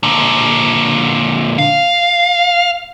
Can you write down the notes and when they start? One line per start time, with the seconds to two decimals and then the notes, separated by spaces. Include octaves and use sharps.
0.03 A#2 D3
1.58 F5